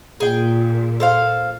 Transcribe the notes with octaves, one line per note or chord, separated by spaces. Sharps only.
A#2 G#4 G5
A4 C5 F5